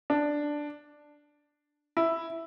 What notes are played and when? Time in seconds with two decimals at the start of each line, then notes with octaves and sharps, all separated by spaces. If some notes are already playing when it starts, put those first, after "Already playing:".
0.10 D4
1.97 E4